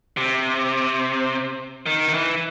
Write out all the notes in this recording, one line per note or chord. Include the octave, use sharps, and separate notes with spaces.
C3
D#3
D#3
E3